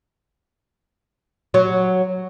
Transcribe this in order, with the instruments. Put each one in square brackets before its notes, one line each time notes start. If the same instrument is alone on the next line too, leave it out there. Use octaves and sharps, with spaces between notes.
[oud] F#3